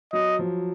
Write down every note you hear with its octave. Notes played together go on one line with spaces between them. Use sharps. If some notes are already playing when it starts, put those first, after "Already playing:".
F#3 D#5
F3